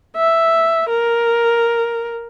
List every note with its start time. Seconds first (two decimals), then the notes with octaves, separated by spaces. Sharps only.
0.16 E5
0.89 A#4